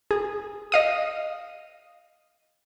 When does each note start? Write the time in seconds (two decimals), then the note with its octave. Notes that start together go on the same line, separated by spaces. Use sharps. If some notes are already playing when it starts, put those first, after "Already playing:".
0.11 G#4
0.72 D#5 F5 D#6